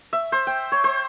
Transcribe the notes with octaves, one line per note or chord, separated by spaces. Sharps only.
E5
C5
G5
C#5
C5